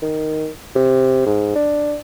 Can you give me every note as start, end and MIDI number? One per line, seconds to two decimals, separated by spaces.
0.02 0.49 51
0.75 1.22 48
1.26 1.53 44
1.55 1.96 62